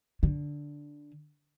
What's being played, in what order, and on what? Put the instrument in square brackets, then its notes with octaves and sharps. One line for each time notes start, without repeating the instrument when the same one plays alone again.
[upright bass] D3